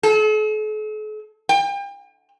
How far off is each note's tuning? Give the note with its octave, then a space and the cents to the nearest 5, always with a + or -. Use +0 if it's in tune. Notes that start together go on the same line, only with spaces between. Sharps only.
A4 -45
G5 +40